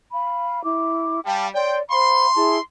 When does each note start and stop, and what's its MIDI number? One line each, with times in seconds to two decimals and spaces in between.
0.13 0.63 77
0.13 0.63 83
0.64 1.20 64
0.64 1.20 86
1.25 1.48 55
1.25 1.46 77
1.25 1.46 79
1.25 1.46 81
1.54 1.80 73
1.54 1.80 74
1.54 1.76 79
1.54 1.80 84
1.90 2.27 72
1.90 2.27 77
1.90 2.27 83
1.90 2.60 84
2.35 2.57 64
2.35 2.57 68
2.35 2.57 81